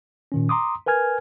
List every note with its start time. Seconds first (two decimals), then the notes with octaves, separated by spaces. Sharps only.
0.32 A#2 D#3 C#4
0.49 A#5 C6 D6 D#6
0.86 A#4 B4 G#5 F6 G#6